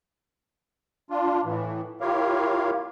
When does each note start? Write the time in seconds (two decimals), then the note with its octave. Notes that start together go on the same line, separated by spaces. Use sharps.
1.10 D4 F4
1.45 A2 E3
2.01 E4 F4 G4 A#4 C#5 F5